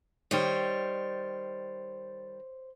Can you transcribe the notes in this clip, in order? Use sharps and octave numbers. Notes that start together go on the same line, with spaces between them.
D#3 G3 C5 C#5